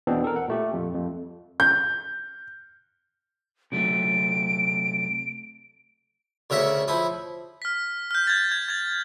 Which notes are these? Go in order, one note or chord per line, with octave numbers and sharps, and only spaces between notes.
E2 B2 E3 B3 C4 D4
A4 A#4
F#5
A#2 A3 G4
F2
F2
G6
C3 F#3 A3 D7
D2 C#3 A#4 E5 C#6
F3 E4 D#6
F6 B6
F6 G6
G#6 A6
G#6
G#6 A6